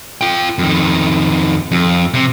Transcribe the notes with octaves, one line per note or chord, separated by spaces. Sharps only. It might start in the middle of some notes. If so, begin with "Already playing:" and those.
F4 G5
F2 D#3
F2
C3